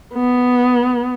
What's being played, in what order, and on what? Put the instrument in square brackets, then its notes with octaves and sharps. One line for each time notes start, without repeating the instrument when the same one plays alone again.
[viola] B3